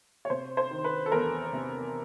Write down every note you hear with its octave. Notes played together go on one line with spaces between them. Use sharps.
C#5
C3 C5
C5
D#3
B4
A4
E2 A#4
C3